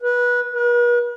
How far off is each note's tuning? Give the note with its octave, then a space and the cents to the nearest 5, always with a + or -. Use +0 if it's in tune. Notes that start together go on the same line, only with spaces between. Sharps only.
B4 -20
B4 -45